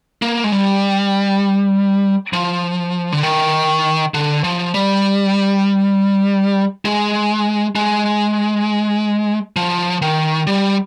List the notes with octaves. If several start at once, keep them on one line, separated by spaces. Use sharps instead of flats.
A#3
G#3
G3
F3
D3
D#3
D3
F3
G3
G#3
G#3
F3
D#3
G3